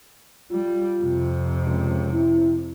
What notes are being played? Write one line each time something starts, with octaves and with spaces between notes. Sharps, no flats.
G3 F4
F2 C3
C#2
E4